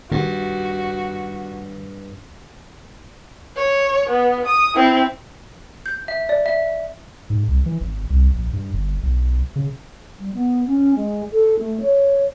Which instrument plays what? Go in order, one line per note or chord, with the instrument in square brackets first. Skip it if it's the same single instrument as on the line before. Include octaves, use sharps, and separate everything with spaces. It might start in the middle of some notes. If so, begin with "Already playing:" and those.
[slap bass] G2 [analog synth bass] D#3 [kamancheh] F#4
[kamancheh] C#5
B3
D#6
C4 E4
[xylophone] G6
E5
D5
E5
[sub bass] G#2
C2
E3
G#1
C2
A#1
G2
G1
B1
C#3
[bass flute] G3
B3
C#4
G#3
A4
A3
C#5